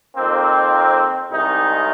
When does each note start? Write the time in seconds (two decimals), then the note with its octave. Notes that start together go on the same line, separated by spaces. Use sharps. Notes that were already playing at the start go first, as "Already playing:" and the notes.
0.16 F2 D#3 A#3 C4
1.31 C2 C3 D#3 G#3 D#4